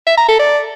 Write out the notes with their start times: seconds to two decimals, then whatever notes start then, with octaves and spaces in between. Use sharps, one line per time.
0.07 E5
0.17 A#5
0.28 A4
0.39 D5